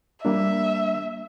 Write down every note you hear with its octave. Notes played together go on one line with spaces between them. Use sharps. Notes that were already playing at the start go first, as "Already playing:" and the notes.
G3 A#3 D4 E5